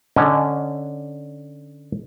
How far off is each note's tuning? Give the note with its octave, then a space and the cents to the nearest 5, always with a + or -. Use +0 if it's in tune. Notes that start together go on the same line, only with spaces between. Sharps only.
D3 +0 C#4 +0 D#5 -20